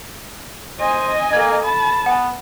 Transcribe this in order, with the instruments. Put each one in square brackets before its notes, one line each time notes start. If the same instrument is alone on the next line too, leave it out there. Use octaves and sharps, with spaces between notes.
[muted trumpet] C5 [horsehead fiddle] D#5 G#5
[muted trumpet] A#3 [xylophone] A4 G#6
[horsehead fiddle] A5 [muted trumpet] B5
[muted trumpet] B3 [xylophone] F#5 G#5